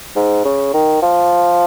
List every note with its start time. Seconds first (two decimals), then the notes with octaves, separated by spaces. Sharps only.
0.16 G#2
0.45 C#3
0.74 D#3
1.02 F3